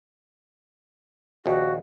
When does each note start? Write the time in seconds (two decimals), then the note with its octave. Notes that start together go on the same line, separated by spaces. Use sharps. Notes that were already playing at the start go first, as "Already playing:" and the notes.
1.46 A#1 D#2 F#4